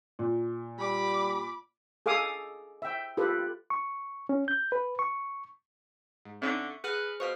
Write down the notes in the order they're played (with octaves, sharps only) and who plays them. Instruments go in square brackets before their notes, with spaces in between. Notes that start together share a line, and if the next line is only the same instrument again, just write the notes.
[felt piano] A#2
[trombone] G3 [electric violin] B5 D6
[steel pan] G#4 A4 F5 D6 D#6
E5 G5
F4 G4 A4 B4
[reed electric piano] C#6
C#4
G6
B4
C#6
[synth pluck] G#2
[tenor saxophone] D3 [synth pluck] C4 C#4 D#4 [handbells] E5 C#6
[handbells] G#4 F6 F#6 [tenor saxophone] B4 [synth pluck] F#5
[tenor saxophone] B2 [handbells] C5 F5 F6 [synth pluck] C#6 C#7